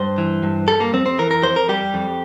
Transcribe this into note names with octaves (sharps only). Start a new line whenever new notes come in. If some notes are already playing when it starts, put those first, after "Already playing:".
Already playing: G2 C5
E3
G2
G3 A4
A#3
F2 C4
C4
E3 A#4
A#4
F2 C5
A#4
G3 G4
F2